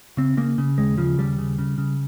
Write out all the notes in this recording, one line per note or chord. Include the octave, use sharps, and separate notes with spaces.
C#3 C4
C#3 A#3
C#3
D#2 G#3
C#3 F3
D#2 G3
C#3
C#3
C#3